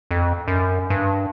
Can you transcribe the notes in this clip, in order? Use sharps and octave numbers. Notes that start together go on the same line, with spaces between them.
F2
F#2
G2